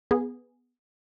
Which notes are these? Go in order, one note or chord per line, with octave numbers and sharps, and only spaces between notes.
B3 G#4